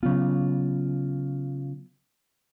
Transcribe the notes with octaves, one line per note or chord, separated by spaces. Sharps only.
C#3 F#3 B3 F4